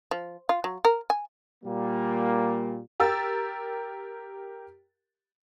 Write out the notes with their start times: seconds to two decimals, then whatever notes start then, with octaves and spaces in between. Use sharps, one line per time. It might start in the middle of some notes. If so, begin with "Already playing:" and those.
0.11 F3
0.49 F4
0.64 F#3
0.85 A#4
1.10 G#5
1.64 A#2 G3 A#3
3.00 G4 A#4 E6 A6